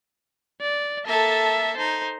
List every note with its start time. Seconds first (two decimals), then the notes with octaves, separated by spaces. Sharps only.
0.61 D5
1.05 A#3 A4 E5 A5
1.77 D#4 C5